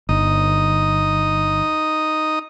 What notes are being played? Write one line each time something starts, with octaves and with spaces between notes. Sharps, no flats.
G1 D#4 D#6